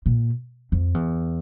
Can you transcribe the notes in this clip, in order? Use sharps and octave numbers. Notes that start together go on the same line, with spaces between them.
A#2
F2
E2